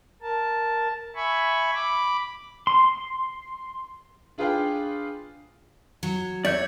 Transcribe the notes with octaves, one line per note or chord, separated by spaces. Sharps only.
A#4 A5
E5 G#5 B5 C#6
B5 D6
C6
D4 F4 G#4 B4 F5 G5
F#3
C#5 D5 E5 G6